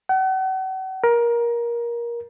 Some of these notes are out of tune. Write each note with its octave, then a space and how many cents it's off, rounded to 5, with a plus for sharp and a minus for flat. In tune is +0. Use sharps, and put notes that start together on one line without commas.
F#5 +40
A#4 +20